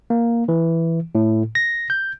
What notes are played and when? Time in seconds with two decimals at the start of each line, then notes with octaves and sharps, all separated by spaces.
0.10 A#3
0.48 E3
1.15 A2
1.55 A#6
1.90 G6